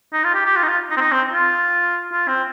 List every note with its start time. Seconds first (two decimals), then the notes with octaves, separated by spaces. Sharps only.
0.13 D#4
0.24 F4
0.34 G4
0.45 G4
0.56 F4
0.63 D#4
0.68 F4
0.90 D#4
0.97 C4
1.01 D#4
1.12 C4
1.34 F4
2.12 F4
2.28 C4